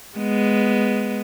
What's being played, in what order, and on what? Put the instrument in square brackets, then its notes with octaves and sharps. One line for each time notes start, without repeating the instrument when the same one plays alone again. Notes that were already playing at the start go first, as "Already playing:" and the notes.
[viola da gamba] G#3 B3